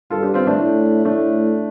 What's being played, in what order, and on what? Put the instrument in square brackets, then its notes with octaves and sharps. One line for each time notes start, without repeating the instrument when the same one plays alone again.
[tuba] G2 [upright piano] F4 A4
[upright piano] D4 G4
C4 F4
A3 D4
[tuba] A2
[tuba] A2 [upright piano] A3 D4